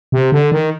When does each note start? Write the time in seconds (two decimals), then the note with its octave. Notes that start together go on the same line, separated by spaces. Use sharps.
0.12 C3
0.32 D3
0.52 D#3